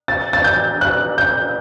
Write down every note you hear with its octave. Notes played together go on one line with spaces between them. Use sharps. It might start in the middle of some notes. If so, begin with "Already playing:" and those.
A6
A6
G6
F#6
G6